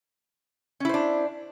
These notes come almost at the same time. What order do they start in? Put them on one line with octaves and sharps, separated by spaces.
C#4 E4 C5 D4